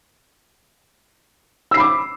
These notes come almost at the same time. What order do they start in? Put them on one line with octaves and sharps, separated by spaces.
E6 C7 B5 D6